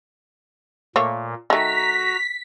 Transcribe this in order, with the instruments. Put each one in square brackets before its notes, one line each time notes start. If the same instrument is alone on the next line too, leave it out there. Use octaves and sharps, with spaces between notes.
[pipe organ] A#2 [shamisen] A3 A#3 C#5
[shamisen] D#3 A3 [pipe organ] F#4 A#5 [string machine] B6